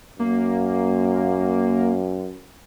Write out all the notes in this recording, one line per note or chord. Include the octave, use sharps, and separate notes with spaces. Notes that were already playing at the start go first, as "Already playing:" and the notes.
F#2 A#3